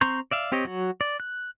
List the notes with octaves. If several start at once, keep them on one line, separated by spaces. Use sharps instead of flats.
C4 A#5 C6 C#6 G6
D5 E5 F5
C4 G4 C#5 D#5
F#3 F#4
D5
F#6